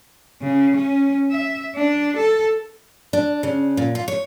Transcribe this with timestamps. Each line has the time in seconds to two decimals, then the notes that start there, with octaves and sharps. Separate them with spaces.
0.42 C#3
0.77 C#4
1.30 E5
1.75 D4
2.17 A4
3.13 D4
3.43 C#3
3.77 A#2
3.95 F4
4.08 C#5